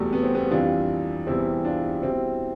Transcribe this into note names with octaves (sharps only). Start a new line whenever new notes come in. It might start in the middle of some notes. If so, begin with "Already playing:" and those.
Already playing: E2 B2 G3 A3
B3
C4
G3 B3
F2 E3 G3 D4 F4
E2 C3 E3 G3 C4 E4
D4 F4
B2 G3 C4 E4